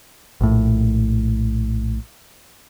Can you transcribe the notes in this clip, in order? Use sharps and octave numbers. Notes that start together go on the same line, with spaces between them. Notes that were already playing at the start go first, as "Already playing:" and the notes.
A#1 A2